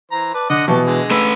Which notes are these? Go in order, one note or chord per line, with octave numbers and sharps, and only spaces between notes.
E3 C5 A#5
B4 D5 A5
D3 D#5 F#5 D6
B2 E3 B3 G4 A5 C#6
D3 G#3
A3 B4 E6